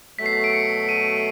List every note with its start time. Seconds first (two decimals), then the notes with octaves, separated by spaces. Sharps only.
0.19 B2 F#3 A3 B6
0.26 C7
0.33 B6
0.44 D7
0.54 C#7
0.89 D#7